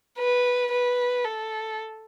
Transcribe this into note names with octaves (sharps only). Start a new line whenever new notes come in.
B4
B4
A4